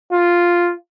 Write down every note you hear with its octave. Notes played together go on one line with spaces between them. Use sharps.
F4